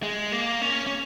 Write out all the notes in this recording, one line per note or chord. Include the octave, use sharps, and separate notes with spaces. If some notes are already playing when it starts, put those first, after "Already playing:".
G#3
A#3
C#4
C#4